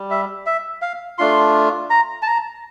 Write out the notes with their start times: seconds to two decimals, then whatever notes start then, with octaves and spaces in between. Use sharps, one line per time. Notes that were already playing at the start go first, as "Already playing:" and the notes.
Already playing: G3
0.10 E5
0.46 E5
0.82 F5
1.18 A3 D4 F4 C6
1.90 A#5
2.22 A5
2.27 A#5